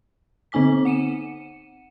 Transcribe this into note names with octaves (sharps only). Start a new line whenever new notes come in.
D3 C4 D#4 G#5 D6 B6
F#5 C#7 D#7 E7